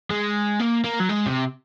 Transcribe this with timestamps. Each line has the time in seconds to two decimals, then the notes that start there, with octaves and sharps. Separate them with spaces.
0.10 G#3
0.60 A#3
0.85 A#3
1.00 F#3
1.10 G#3
1.26 C3